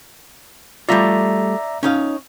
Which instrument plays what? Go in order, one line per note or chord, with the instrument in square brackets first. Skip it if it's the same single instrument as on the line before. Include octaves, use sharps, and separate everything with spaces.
[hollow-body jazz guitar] G3 A3 F4 [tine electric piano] D5 E5 A#5
[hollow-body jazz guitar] C#4 D#4 F5